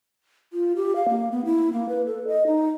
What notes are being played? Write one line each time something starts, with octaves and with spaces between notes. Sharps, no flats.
F4
G4
F5
A#3
B3
E4
A#3
B4
A4
D#5
D#4